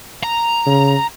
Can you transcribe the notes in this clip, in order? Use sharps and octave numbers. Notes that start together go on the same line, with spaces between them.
A#5
C#3